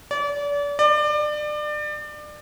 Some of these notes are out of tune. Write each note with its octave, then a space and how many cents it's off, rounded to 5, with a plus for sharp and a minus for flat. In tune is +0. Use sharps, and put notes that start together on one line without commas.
D5 -35
D5 +30